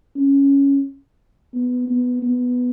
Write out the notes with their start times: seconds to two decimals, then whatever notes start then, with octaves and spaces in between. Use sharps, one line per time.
0.16 C#4
1.53 B3
1.87 B3
2.22 B3